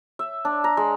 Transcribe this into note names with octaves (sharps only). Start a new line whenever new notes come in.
E5
D4
A#5
G#3